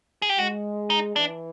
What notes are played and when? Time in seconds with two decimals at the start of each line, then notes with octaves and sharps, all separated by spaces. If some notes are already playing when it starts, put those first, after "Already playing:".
0.22 G#4
0.29 G4
0.39 G#3 F#4
0.90 D#4
1.16 E3 D4